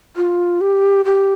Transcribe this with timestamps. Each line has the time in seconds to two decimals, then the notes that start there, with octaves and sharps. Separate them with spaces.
0.16 F4
0.61 G4
1.05 G4